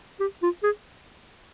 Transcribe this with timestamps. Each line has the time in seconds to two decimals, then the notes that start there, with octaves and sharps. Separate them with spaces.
0.20 G4
0.43 F4
0.63 G#4